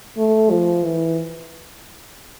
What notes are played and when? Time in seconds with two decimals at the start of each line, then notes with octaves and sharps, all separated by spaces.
0.18 A3
0.51 F3
0.85 E3